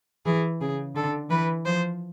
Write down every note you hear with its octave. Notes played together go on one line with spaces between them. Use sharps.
E3 G#4
C#3 G#4
D3 A4
E3 B4
F3 C5